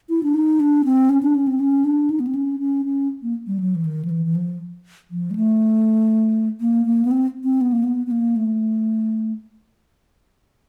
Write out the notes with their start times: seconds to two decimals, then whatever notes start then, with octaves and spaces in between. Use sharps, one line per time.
0.10 E4
0.23 D4
0.34 D#4
0.60 D4
0.85 C4
1.09 C#4
1.23 D4
1.34 C#4
1.47 C4
1.60 C#4
1.84 D4
2.10 D#4
2.20 B3
2.27 C4
2.35 C#4
2.60 C#4
2.85 C#4
3.22 A#3
3.47 G3
3.60 F#3
3.75 E3
3.85 D#3
4.05 F3
4.10 E3
4.25 E3
4.35 F3
5.11 F3
5.31 G#3
5.35 A3
6.61 A#3
6.86 A#3
7.05 B3
7.11 C4
7.44 C4
7.61 B3
7.72 A#3
7.84 B3
8.07 B3
8.11 A#3
8.36 A3